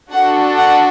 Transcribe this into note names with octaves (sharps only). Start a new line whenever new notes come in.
D4 F#4 A4 F#5
F#5